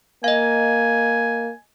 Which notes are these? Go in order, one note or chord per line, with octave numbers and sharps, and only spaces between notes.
A#3 D#5 F5 G#5